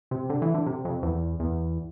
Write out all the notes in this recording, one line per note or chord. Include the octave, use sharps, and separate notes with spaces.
C3
D3
E3
D3
C3
F2
E2
E2